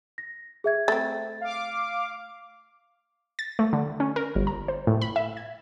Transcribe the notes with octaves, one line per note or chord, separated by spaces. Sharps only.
A#6
G#4 E5 G#6
A3 C4 A6
F5 D6
A6
A3
D3
C#4
A#4
G1
A#5
C5
A2
B5
E5
G#6